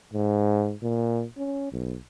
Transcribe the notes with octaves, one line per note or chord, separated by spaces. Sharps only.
G#2
A#2
C#4
B1